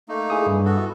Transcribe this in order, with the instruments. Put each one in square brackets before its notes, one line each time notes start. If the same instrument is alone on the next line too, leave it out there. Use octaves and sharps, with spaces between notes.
[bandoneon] A3 A#3 D#4
[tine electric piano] E4 G#4 D#6
G2
[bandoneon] B3 F#4 A4
[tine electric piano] E4